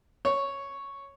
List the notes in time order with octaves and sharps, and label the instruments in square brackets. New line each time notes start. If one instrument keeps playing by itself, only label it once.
[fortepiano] C#5